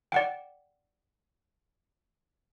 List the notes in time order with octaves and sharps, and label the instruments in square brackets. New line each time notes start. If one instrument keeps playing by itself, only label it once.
[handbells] D5 F#5 G5